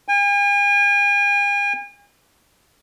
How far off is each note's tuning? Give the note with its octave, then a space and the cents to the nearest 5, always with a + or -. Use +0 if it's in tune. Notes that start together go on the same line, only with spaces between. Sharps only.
G#5 -45